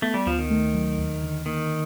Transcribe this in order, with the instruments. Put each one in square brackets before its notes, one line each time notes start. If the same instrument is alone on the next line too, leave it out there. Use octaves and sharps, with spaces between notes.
[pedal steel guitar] A3 [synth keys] B3
[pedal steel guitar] G3
[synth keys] D2 [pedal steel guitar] F3
[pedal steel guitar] D#3
[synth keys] A3
F#3
D#2
D3
[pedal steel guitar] D#3 [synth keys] A#3